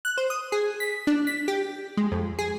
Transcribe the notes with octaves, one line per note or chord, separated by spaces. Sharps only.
F#6
C5
D#6
G#4
B6
D4
B6
G4
G#3
F2
G#4